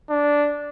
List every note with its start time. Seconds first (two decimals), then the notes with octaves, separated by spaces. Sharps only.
0.10 D4